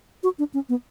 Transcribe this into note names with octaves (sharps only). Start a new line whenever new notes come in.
F#4
D4
C#4
B3